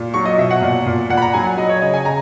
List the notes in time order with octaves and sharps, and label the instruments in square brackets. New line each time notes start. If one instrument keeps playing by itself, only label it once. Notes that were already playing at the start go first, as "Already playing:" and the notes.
Already playing: [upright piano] A#2
F#3 C#6
D#5
B2 E5
F#5
A#2
A#2
A#2 F#5
B5
A#5
F#3 G#5
F#5
F#3 D#5
C#5
C#3 D#5
G#5
C#3 A#5